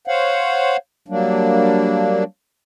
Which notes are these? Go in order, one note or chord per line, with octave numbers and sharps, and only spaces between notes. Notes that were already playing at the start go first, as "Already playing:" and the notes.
C5 C#5 F5 F#5
F#3 G3 A#3 D4